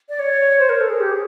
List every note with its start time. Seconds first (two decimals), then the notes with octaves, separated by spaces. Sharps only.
0.09 D5
0.19 C#5
0.59 C5
0.69 A#4
0.81 A4
0.90 G#4
1.00 G4
1.11 G#4